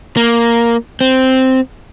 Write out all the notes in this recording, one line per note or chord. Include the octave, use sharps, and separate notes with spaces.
A#3
C4